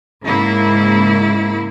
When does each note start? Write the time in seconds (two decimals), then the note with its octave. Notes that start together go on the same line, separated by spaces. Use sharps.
0.22 G#2 C#3 A#3 E4